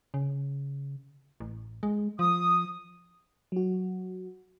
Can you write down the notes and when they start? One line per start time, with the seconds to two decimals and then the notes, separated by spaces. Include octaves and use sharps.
0.14 C#3
1.40 A1
1.83 G#3
2.19 F3 D#6
3.52 F#3 F#4